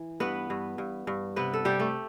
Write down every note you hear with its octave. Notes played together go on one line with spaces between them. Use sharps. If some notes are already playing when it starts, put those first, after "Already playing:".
Already playing: E3
G2 B3 B4
G2
G2
G2
C3 B3 B4
A4
C3 G3 G4
A3